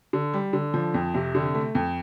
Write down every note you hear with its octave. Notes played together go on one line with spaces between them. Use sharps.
D3
G3
D3
F3
F2
C3
D3
A3
F2